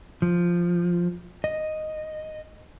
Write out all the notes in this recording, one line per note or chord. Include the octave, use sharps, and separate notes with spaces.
F3
D#5